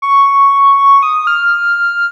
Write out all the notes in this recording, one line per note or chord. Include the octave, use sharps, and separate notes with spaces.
C#6
D#6
F6